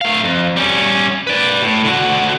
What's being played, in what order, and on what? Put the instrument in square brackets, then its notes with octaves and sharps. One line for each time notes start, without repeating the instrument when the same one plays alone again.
[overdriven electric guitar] A3 F5
F2
G3 C#4
B4 D5
A2
D3 F#4